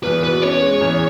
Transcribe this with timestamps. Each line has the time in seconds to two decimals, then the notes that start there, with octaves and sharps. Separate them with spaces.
0.03 E2 B4
0.23 B2 B4
0.42 C#4 C#5
0.61 G#3
0.81 E2